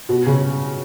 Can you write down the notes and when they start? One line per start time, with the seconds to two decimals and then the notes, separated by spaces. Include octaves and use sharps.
0.09 B2
0.26 C#3